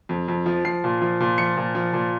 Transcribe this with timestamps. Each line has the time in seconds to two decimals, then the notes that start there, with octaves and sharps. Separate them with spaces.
0.09 F2
0.28 F2
0.46 F3
0.65 F3 C7
0.84 A#2
1.02 F3
1.20 A#2
1.38 F3 C#7
1.57 A#2
1.75 F3
1.93 A#2